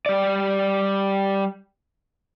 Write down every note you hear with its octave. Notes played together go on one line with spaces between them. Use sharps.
G3 D5